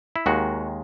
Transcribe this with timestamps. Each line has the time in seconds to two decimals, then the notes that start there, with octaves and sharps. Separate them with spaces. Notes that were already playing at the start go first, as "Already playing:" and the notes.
0.16 E4
0.26 D#2 D#3 G#3 F#4